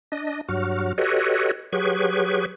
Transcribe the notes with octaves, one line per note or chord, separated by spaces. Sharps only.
D4 D#5
G2 F#3 F#4 F6
F#4 G4 A4 B4 C#5 D#5
F#3 G4 G#4 B4 C#6